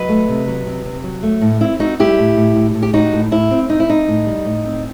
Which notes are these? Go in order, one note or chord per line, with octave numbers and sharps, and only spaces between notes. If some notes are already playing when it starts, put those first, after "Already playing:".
Already playing: F#3 B4 D#5
A3
C3
F#3
C3
C3
F#3
A3
A2
C4 E4
C4 D#4 F#4
G3 E4 G4
A2
A2
A2
A2
G4
A2 D#4 F#4
A2
A2 E4
C4
C4 D#4
E4
C4 D#4
A2
G3
A2
C4